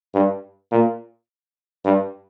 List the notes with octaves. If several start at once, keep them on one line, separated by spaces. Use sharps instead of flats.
G2
A#2
G2